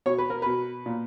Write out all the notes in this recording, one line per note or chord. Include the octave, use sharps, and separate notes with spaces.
B2 C#5
B4
A#4
B2 B4
A#2